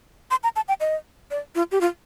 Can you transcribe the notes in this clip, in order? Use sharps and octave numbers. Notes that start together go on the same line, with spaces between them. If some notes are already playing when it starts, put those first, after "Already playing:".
C6
A#5
A5
G5
D#5
D5
F4
G4
F4